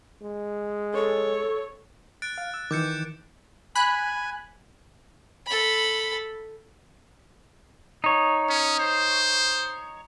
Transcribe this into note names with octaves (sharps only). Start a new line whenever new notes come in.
G#3
A4 C#5
F#6 A6 D7
F5
E6
D#3 E3 D6 G6 C#7
G#5 B5 F#6
A4 B5
D#4 C#5
C#4
C5